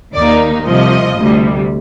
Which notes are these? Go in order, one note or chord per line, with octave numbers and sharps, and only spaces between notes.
D#2 D#3 A#3 D#4 D5
C2 C3 F3 D#5
D2 C3 G3